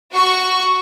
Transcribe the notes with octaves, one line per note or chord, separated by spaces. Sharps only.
F#4 C#6